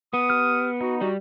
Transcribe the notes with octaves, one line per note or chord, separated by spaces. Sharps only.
B3 D#6
G4 F6
D#4 F#4
G3 F#4